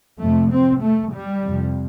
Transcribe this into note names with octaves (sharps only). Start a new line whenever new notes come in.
F2 C3 A3
C4
A3
G3
F2 C3